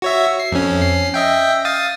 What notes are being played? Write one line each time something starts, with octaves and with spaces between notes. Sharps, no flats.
F#4 C#5 E5
C7
F2 C#4
C#4 C7
D#5 E5 G5
F5 D#6 A6